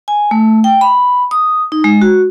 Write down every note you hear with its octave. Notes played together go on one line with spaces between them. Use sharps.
G#5
A3
G5
B5
D#6
D#4
G#3
F#4